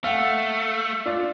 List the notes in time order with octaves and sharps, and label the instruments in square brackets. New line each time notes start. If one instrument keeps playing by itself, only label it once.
[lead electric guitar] A3 [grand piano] F5 F#5
[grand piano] D4 F4 D5